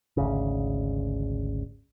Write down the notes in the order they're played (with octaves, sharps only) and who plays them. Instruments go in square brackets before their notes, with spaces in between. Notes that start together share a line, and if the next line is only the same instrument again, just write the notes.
[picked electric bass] G#1 D2 C#3